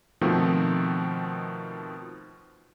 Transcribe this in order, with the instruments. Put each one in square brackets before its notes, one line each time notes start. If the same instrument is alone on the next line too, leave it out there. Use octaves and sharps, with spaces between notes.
[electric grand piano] B2 D#3 F3 A3 C4